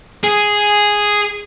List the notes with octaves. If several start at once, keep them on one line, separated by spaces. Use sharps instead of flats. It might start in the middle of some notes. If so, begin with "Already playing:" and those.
G#4